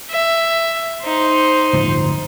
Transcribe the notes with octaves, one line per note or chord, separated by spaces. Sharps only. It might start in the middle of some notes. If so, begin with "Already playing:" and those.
E5
D#4 C5
D1 G1 F3